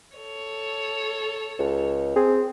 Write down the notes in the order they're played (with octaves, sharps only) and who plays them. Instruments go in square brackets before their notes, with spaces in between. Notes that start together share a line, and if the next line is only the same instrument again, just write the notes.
[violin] A4 C#5
[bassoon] C#2
[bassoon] C4 [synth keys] G#4